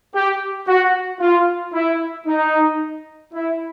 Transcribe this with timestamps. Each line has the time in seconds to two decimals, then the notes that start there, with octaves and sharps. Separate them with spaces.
0.14 G4
0.67 F#4
1.20 F4
1.73 E4
2.26 D#4
3.32 E4